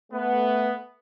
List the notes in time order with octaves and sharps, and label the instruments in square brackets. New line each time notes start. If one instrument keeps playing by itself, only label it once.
[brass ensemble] A3 B3